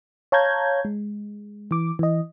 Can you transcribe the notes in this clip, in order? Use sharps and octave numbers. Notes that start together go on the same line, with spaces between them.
C#5 F5 A5 A#5 G6 G#6
G#3
E3 D6
E3 D#5